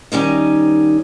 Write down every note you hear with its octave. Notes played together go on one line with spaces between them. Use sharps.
D#3 G3 C#4 D#4